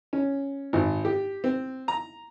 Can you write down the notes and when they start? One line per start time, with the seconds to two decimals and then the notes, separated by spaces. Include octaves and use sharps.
0.13 C#4
0.73 G#1
1.05 G4
1.44 C4
1.88 A#5